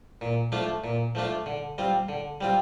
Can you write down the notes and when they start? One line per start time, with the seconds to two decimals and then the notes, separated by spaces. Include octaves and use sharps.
0.21 A#2
0.52 F3 A3 D4 F4
0.84 A#2
1.15 F3 A3 D4 F4
1.46 D3
1.78 G3 C4 F4
2.09 D3
2.41 G3 C4 F4